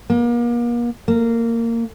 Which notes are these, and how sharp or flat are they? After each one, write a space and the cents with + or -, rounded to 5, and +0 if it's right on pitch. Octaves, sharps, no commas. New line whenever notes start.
A#3 +40
A#3 -15